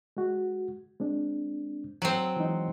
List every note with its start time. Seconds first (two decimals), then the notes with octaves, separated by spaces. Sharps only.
0.17 G#3 F#4
1.00 G#3 C4 D4
2.02 F#3 C4
2.36 E3 G#3 D#4